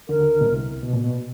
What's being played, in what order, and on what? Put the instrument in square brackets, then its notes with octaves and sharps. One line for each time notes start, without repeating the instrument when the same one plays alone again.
[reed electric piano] D2 D3 [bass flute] A#4
[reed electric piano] B2
C2 C3
B2
A#2
B2